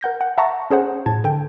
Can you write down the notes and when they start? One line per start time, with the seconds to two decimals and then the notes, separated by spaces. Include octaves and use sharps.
0.01 A#4 F#5 G6 A#6
0.21 F#5
0.38 E5 F#5 A5 A#5 C#6 A#6
0.70 C#4 G#4 C5 F#5
1.06 A2 A5 G#6
1.24 D3 G5